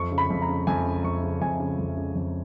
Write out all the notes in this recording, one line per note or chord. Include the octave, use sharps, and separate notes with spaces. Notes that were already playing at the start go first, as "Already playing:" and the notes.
Already playing: F2 C#6
C#3
B5
F2
A#5
C#3
F2 G#5
C#3
F2 C#6
C#3
F2 G#5
C#3
F2
C#3
F2